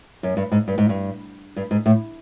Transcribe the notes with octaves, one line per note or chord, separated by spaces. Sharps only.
F#2
G2
G#2
G2
G#2
G2
G2
G#2
A2